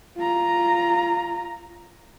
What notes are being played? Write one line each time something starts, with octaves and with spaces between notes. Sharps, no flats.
F4 A#5